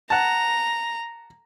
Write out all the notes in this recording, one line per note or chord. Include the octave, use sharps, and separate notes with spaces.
F#5 A5 A#5